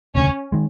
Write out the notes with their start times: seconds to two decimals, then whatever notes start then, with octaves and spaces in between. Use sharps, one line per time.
0.15 E1 D2 C#3 C#4
0.52 D#3 G#3